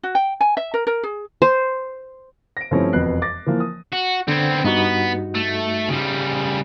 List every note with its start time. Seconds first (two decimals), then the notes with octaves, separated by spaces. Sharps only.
0.03 F#4
0.15 G5
0.41 G#5
0.57 E5
0.74 A#4
0.87 A#4
1.03 G#4
1.42 C5
2.57 A#6 D7
2.71 G2 F3 A3 C4 C#4 E4
2.93 E1 F2 B3 F#6 C7
3.22 D6 A6 A#6
3.46 E3 F3 A#3
3.60 D#6
3.93 F#4
4.28 D3 B3 C4 G#6
4.64 G2 B3 D#4 F#4
5.35 A3
5.89 C#3 G3